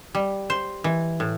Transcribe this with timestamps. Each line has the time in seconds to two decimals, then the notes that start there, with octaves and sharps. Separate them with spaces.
0.15 G3
0.50 C5
0.84 E3
1.20 A2